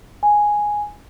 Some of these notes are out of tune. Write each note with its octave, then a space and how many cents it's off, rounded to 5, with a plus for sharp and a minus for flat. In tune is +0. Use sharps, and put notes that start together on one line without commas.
G#5 +0